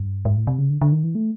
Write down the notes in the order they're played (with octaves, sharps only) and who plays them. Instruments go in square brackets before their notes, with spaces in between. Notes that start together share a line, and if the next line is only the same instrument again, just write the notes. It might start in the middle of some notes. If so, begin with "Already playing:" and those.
Already playing: [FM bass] G2
G#2
A2
C3
C#3
D3
D3
D#3
E3
A3